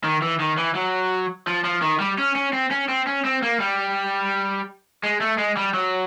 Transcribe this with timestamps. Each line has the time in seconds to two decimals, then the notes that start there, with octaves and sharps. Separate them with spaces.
0.04 D#3
0.22 E3
0.40 D#3
0.58 E3
0.75 F#3
1.47 F3
1.64 F3
1.82 D#3
2.00 G3
2.18 C#4
2.36 C#4
2.53 C4
2.71 C#4
2.89 C4
3.07 C#4
3.24 C4
3.42 A#3
3.60 G3
5.03 G#3
5.20 A3
5.38 G#3
5.57 G3
5.74 F#3